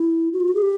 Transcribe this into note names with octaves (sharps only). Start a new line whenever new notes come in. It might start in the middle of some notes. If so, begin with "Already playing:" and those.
Already playing: E4
F#4
F4
F#4
G#4
G4